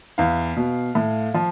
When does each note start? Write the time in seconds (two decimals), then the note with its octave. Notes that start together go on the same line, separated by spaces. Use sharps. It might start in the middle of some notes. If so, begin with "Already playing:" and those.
0.18 E2 F5
0.57 B2
0.95 A2
1.34 F3